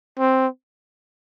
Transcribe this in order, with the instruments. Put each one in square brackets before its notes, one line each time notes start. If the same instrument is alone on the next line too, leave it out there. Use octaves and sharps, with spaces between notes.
[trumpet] C4